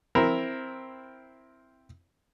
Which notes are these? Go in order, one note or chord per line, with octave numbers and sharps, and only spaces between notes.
C4 E4 A#4